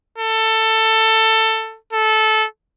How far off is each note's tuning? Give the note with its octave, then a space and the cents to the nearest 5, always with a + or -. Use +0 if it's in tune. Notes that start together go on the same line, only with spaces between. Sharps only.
A4 +15
A4 -15